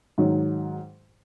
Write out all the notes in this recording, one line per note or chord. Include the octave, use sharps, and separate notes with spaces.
G#2 D#3 F#3